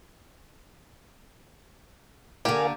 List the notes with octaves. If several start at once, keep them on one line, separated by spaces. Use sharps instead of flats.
D3 A#3 G4 A#4 F5 G#5